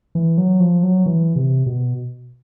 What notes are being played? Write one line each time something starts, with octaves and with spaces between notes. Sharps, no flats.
E3
F#3
F3
F#3
E3
C3
B2